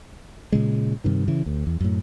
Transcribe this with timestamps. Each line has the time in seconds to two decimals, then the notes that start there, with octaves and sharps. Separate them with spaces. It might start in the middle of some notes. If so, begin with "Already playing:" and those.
0.52 A#2 C#3 G#3
1.04 G2 C3 D#3
1.28 C#3 E3
1.46 D2
1.67 E2
1.81 F#2 A2